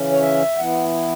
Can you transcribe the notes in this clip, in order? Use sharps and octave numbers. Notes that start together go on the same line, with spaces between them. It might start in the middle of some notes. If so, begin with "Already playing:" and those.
Already playing: C#3 E3 C#4
C#5
E5
E3 B3 E4 F#5